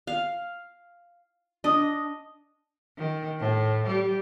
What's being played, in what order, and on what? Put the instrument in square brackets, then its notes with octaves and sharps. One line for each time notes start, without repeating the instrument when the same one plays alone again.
[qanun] F5
[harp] D4 D#6 [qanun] D#5
[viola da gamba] D#3
A2
G3